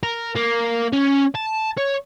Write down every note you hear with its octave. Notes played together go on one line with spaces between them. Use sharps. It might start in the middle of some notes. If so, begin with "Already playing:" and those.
A#4
A#3
C#4
A5
C#5